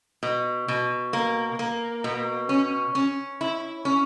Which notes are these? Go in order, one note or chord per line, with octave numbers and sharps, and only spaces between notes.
B2
B2
A#3
A#3
B2
C#4
C#4
E4
C#4